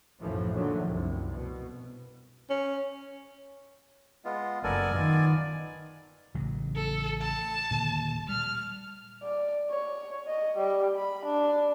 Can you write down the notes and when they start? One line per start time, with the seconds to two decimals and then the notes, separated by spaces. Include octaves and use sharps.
0.20 B1 F#2 A2 E3 F3 A3
0.54 A#2 D3 D#3 F3 F#3 A3
0.84 C2 F#2
1.30 B2
2.50 C#4
4.25 G#3 B3 F4
4.64 F#1 B3 A4 A#4 D5 G#5
4.95 D#3 B3 F4
6.34 A1 C#3 F#3
6.76 A4
7.22 A5
7.70 D#1 A#2 D3
8.29 G3 F6
9.23 D5
9.70 C#5
10.28 D#5
10.58 G3
10.97 B5
11.26 D4